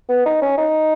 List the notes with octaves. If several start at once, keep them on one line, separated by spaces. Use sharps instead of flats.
B3
D#4
C#4
D#4